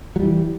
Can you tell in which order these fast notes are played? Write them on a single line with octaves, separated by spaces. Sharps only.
F#3 G3 E3